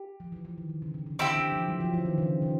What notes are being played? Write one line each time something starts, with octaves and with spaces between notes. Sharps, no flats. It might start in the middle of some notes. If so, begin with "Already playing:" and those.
Already playing: G4
F3
E3
E3
D#3
D3
C#3
C#3
D3
D3 C4 E4 G4
E3
F3
F#3
F3
E3
D#3
C#3
C#3